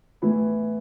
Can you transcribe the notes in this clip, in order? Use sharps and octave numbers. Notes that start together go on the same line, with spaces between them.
A2 E3 B3 E4